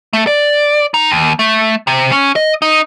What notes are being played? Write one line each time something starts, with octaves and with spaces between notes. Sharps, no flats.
A3
D5
D#4
D#2
A3
C3
C#4
D#5
D#4